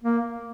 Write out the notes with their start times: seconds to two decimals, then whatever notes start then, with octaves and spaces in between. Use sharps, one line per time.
0.03 A#3